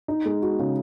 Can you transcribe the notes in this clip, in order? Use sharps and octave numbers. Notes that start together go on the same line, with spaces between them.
D#4
G#3
F#4
C#3